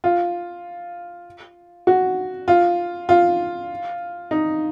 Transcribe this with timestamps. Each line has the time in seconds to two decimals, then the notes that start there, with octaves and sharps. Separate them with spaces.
0.04 F4
1.87 F#4
2.48 F4
3.09 F4
4.31 D#4